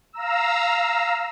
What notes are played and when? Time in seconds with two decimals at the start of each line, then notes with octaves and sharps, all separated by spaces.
0.12 F5 A#5 E6